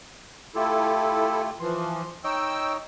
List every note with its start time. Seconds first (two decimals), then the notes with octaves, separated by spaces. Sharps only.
0.55 A3 E4 F4 G4 A4
1.60 E3 F3 C6
2.24 D#4 C#5 D#5 G5 E6